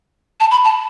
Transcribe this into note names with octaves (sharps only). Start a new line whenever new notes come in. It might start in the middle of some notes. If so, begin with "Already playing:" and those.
A5
B5
A5